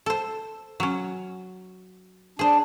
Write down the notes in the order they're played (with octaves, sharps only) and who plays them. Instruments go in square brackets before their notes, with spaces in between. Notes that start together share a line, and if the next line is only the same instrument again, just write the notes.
[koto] A4 C5
F#3 C#4
[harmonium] D4 [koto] G#4 C5